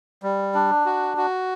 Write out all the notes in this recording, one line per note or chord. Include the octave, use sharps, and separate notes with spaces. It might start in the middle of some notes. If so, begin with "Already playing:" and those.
G3
D4
F#4
F#4